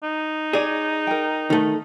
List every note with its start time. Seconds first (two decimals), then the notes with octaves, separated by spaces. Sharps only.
0.03 D#4
0.53 G#4 C#5 D5
1.07 A#4 G5
1.50 D#3 A3